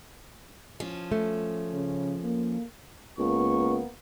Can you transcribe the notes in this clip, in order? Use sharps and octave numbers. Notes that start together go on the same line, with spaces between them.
F3 C#4
A3
C#3
A#3
C#2 A#3 B3 C#6